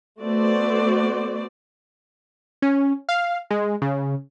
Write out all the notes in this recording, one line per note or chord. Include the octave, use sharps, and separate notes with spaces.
A3 B3 F#4 C5 D5
C#4
F5
G#3
C#3